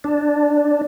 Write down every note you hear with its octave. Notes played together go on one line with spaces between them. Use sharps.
D4